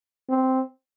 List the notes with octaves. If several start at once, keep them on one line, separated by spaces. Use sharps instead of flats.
C4